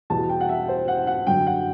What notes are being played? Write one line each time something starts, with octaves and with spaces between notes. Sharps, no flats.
E2 B2 G3 A5
G5
F#5
E5
C5
F#5
F#5
F#2 D3 F#3 G5
F#5